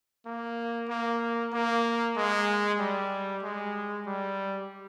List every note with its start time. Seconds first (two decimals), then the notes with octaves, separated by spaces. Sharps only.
0.26 A#3
0.89 A#3
1.53 A#3
2.16 G#3
2.79 G3
3.43 G#3
4.06 G3